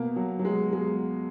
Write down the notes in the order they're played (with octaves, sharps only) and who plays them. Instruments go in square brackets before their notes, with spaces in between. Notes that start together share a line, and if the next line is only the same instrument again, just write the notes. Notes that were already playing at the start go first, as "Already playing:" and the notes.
Already playing: [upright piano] B2 A#3
F#3
F#3
G#3
G#3